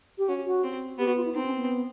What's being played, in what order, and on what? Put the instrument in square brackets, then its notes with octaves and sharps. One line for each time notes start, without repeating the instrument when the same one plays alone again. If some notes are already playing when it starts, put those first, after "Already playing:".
[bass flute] G4
[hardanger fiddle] C#4 [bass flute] F#4
[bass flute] F#4
[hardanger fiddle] C4
[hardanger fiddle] B3 [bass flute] G4
[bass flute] F#4
F4
E4
[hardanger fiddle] C4 [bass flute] D#4
[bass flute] C#4
B3